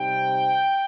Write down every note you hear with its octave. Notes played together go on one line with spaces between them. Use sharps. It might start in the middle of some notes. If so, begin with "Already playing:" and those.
Already playing: C3 G3 C4 D#4 G5